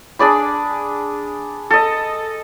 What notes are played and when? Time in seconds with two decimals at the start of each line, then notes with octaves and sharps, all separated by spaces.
0.19 D4 G#4 D5 B5
1.71 A4 D#5